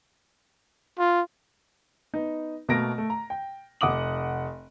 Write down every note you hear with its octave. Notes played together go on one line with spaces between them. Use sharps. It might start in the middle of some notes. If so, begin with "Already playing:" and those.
F4
B3 D#4
B2 A3 A#3 A#4 A#6 D7
A3
A#5
G5
F1 F#5 D6 D#6 F#7